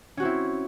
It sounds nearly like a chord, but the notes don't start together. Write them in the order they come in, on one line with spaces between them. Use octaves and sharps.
C#4 F#4 C4 E4